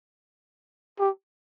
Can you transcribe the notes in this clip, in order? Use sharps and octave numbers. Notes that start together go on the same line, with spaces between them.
G4